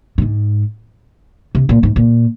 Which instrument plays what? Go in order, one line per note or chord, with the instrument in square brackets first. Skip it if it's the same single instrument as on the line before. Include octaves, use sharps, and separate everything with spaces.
[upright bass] A#2
G#2
C3
A#2
G#2
A#2